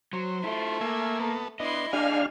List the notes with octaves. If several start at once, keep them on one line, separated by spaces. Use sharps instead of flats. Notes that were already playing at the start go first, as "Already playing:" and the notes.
F#3 C5
A3 E4 F4
A#3 E5 G#5
B3 A4
B3 D4 E4 D#5 C6
D4 G4 G#4 D#5 F5 G#5 F6